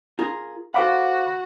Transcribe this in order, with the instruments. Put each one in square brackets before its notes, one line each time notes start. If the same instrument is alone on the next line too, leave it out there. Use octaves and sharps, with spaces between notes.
[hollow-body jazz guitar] F4 G#4 A#4
[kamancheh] F#4 [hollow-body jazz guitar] A4 C5 F#5 [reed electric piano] F5 B5 D6